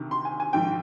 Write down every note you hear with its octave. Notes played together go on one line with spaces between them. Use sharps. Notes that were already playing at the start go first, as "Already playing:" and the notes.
Already playing: D2 C3 D#3
C6
G#5
G#5
A#1 G#2 D#3 G5